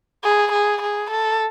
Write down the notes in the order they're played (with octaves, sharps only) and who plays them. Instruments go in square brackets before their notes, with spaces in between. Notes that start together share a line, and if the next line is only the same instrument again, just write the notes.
[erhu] G#4
G#4
G#4
A4